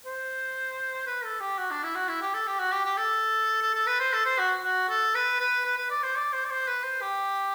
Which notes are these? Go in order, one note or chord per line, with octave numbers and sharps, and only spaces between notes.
C5
B4
A4
G4
F#4
D4
E4
F#4
E4
G4
A4
G4
F#4
G4
G4
A4
A4
A4
B4
C5
A4
C5
F#4
F#4
A4
B4
B4
B4
B4
D5
C5
D5
C5
D5
C5
B4
C5
G4